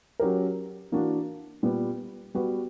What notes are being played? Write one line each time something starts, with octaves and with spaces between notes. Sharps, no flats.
F#3 C#4 G4 A#4
E3 A#3 D4 F#4
A#2 G3 B3
G3 B3 F#4 B4